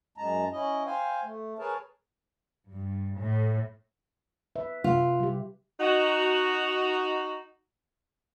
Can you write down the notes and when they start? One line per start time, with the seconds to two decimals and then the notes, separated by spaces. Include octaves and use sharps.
0.18 F#2 G#3 A5 A#5
0.52 C#4 E4 D#5
0.86 C5 F5 G5 G#5
1.23 A3
1.59 G#4 A#4 B4 C#5 A5
2.70 G2
3.16 A2
4.56 B4 E5
4.84 C3 F4
5.20 G3 G4
5.80 D#4 F#4